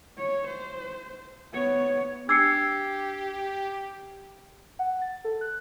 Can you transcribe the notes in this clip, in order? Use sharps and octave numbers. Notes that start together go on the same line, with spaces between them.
C#5
C5
B3 C#5
D4 G4 D6 E6 G#6 C7 C#7
F#5
A6
A4
F#6